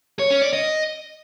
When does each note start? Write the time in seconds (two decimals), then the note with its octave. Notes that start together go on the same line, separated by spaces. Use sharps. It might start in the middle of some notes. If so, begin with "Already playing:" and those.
0.19 C#5
0.31 C#4
0.42 D5
0.53 D#5